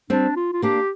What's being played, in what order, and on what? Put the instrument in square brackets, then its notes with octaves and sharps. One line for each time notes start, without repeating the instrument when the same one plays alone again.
[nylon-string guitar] G3 C4 [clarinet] D4
[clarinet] F4
F4
[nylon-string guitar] A#3 D4 [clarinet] G4